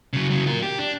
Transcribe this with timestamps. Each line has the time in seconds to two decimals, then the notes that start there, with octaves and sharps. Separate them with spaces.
0.13 C#3 F#3
0.30 C#3 F#3
0.46 F4 A#4
0.62 G4
0.78 D4